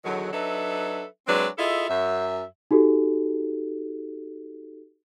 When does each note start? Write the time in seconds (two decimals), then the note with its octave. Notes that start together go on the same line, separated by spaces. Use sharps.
0.05 E2 D3 D#3 F#3
0.33 F#3 D4 D#4 A4 B4 E5
1.27 F#3 G#3 C4 D4 B4 C#5
1.58 E4 F4 G#4 A4 D#5 E5
1.89 F#2 E5
2.71 D#4 F#4 G4 A4